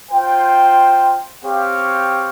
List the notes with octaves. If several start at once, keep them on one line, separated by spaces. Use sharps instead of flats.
F4 C5 G5
C4 G4 C#5 F5